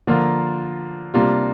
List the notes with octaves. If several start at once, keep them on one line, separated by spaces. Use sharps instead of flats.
D3 F3 A#3 F4 A#4
C3 G3 A#3 D4 F4